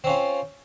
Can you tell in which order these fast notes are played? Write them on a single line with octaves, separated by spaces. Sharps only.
C4 C#4 F4